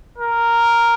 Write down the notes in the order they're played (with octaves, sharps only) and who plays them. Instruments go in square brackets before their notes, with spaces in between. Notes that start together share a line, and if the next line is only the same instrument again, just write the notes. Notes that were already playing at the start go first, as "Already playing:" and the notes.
[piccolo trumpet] A#4